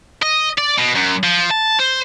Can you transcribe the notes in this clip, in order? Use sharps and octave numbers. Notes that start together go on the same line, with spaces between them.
D#5
D5
B2
F#2
F3
A5
C5